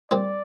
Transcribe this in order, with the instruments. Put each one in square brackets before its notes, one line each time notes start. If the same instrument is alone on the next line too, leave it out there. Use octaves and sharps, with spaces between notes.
[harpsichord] A#2 G3 C4 [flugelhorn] D5